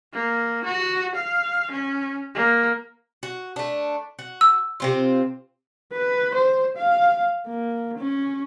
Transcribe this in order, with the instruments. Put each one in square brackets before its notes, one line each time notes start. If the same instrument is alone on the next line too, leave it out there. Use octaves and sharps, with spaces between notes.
[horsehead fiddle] A#3
F#4
F5
C#4
A#3
[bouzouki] F#4
A3 D4
F#4
[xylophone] E6
[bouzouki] C3 C4 F4
[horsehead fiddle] B4
C5
F5
A#3
C#4